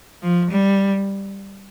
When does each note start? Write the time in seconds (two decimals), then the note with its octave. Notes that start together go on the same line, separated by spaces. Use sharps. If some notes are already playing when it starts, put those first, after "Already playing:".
0.23 F3
0.51 G3